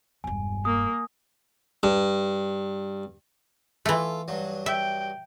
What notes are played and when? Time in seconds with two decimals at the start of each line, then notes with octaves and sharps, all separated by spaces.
0.24 E1 G2 G#5
0.65 A#3 D#6
1.83 G2
3.86 E3 A3 F4 A4
4.28 G2 F#3
4.66 E5 G5